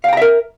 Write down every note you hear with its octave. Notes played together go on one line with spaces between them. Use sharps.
A#4 E5 F5 G5 A#5